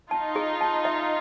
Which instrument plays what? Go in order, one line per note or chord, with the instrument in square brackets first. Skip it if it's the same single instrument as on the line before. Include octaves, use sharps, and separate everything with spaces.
[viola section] D#4 F4 [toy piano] A5
[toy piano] G#4
A5
E5